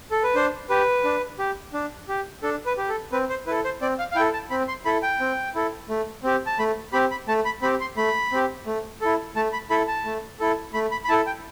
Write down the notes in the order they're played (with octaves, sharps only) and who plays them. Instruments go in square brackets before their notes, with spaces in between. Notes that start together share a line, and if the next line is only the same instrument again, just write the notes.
[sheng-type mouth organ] A4
B4
D4 C5
G4 B4
D4
G4
D4
G4
D4 A4
B4
G4
A4
C4 B4
C5
E4 A4 B4
C5
C4 D5
F5
F5
E4 G5
A4
A5
C4 B5
C6
E4 A4 B5
G5
C4
E4 A4
A3
C4 G4
A5
A3 B5
C4 G4 B5
B5
A3 A5
B5
C4 G4 B5
C6
A3 B5
C4 G4
A3
E4 A4
A3 A5
B5
E4 A4 B5
A5
A3
E4 A4
A3 B5
B5
B5
E4 A4 A5
G5